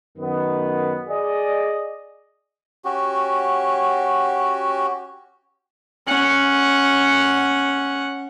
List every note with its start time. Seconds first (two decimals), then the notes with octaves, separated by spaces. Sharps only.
0.18 F#2 D#3 B3
1.09 G#4 D5 D#5
2.85 C#4 F#4 G4
6.07 C#4 F#5